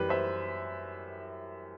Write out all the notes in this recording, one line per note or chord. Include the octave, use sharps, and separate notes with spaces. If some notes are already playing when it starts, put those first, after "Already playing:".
Already playing: F#2 E3 G3 G4 B4
C5 E5